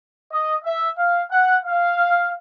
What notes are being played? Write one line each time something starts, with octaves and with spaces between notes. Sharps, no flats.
D#5
E5
F5
F#5
F5